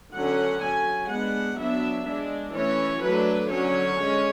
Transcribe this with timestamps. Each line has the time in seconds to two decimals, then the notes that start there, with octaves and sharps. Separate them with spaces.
0.13 D3 F#3 C#4 F#5
0.62 F#3 C#4 G#5
1.09 G#3 B3 D4 F#5
1.58 F#3 B3 D4 E5
2.06 G#3 D4
2.54 E3 A3 C#4 C#5
3.02 F#3 A3 D4 B4
3.50 D3 F#3 C#4 C#5
3.98 G#3 C#4